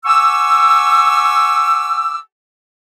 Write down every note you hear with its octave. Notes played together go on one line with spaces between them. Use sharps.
F#5 G#5 C#6 D6 E6